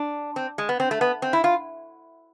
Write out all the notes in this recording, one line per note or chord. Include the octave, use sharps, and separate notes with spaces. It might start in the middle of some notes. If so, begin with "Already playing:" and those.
Already playing: D4
C4
G#3
B3
C4
A3
B3
C4
E4
F4